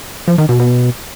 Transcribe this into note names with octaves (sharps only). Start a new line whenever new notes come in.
F3
D#3
B2
B2